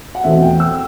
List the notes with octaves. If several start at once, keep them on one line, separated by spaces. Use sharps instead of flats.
F#5
E2 B2 A3 C4 E5
G5
E6